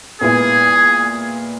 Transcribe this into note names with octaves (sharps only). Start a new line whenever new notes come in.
A#2 G#3 B3 E4 G#4